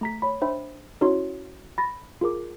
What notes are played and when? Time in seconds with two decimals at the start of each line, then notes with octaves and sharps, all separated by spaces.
0.01 A3 A#5 B6
0.22 C#5 B5
0.41 D4 D#4 C5 E5 G5 B5
1.01 C#4 D#4 E4 F#4 C#5 C6
1.78 B5 A6 A#6
2.21 F4 G#4 A#4 D6